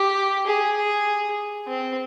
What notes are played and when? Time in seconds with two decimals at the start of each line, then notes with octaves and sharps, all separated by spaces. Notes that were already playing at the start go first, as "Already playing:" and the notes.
Already playing: G4
0.47 G#4
0.77 G#4
1.67 C4